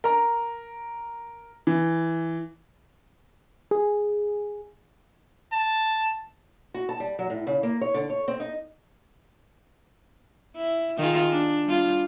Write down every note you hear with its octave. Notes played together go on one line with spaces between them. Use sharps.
A#4 A#5
E3
G#4
A5
F#4
A5
G3
F#3
A2
C#3
A#3
C#5
D3
C#5
C4
D#4
E4
D#3 F4 G#4
D4
G3 F4